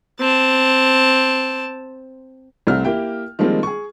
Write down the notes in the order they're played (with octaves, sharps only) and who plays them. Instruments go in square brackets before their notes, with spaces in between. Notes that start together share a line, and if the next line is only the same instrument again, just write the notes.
[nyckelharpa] C4 A5
[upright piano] C2 A3 C4 F6
A#3 E4 G4 G5
D#3 F3 G3 G#3 A#3 C4
G#4 C#6